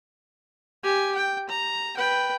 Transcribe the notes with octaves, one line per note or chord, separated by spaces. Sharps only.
G4 G#5
G5
A#5
B4 G5